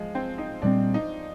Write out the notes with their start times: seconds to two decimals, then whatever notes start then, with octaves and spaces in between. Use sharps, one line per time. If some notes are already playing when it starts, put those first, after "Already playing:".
Already playing: F3 G#3
0.15 C4
0.38 D#4
0.62 A#2 G3 C4 D4
0.94 D#4